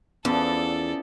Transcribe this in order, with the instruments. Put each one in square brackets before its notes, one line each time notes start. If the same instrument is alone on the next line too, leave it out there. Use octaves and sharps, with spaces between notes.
[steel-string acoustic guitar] E2 [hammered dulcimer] F3 B3 E4 [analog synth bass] C#4 [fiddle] A4 D5